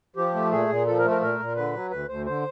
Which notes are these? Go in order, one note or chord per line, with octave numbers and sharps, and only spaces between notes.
F3 G4
A3
A#2 G#4
A#2
F3 A4
A#4
A3
A#4
A#2 A#4
A#2
D3 B4
F#3
D2 B4
D2 C5
D3 C5